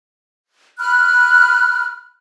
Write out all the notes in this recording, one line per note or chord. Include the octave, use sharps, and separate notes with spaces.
B5 F6 F#6